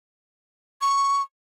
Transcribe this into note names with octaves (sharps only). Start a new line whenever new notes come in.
C#6